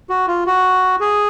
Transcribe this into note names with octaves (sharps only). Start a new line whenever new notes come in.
F#4
F4
F#4
G#4